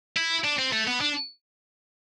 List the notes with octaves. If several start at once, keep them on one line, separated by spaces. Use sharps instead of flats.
E4
D4
C4
A3
B3
D4